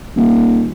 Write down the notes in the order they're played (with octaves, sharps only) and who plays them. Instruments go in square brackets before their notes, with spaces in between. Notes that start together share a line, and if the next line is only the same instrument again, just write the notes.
[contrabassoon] D#1